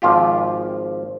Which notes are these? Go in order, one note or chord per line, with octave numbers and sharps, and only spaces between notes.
G#1 F3 F4 G4